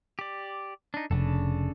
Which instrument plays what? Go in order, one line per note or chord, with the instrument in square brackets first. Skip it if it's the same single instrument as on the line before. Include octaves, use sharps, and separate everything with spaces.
[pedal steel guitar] G4 D5
D4 D#4
[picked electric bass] F1 [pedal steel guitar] C#3 D4 A4